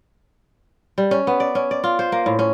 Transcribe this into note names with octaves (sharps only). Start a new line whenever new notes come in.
G3
C#4
B3
D5
C#4
D5
F4
C5
A#3
A2
C#4